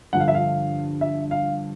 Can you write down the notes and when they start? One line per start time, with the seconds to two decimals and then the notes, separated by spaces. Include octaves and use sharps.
0.13 G2 D3 F3 F#5
0.20 F5
0.28 E5
0.35 F5
1.01 E5
1.31 F5